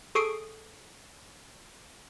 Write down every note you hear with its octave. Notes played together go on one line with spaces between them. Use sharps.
G#4 A4 C#6 D#6 C7 D7